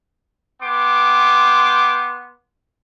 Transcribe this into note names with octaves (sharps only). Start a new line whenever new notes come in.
B3 G5 C6 D6